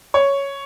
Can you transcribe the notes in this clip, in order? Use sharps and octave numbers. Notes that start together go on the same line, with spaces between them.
C#5